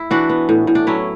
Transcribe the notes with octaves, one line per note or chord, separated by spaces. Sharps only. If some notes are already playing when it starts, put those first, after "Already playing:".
Already playing: E4
E3 D4 F#4
B3
A2
A2
D4
F#3 C#4 E4